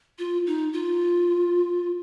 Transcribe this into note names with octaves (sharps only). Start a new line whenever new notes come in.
F4
D#4
F4